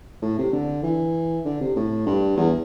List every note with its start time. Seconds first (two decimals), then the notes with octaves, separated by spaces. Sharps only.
0.22 A2
0.38 C3
0.52 D3
0.83 E3
1.45 D3
1.61 C3
1.76 A2
2.06 G2
2.37 E2